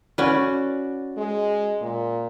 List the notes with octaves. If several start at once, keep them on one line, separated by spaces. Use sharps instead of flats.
C#4 F#4 B4 D5 F#5
G#3
A#2